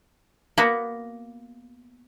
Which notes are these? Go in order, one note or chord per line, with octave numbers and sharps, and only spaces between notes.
A#3 B3 F#4